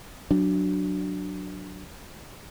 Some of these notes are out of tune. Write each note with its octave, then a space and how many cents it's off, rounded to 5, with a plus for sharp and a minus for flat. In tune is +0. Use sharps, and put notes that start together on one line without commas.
F#3 +0 D4 +0